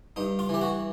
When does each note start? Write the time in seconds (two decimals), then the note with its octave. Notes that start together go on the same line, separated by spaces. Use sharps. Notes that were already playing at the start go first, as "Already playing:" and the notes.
0.16 G2 D#4
0.39 F4
0.49 E3 G4
0.61 F#4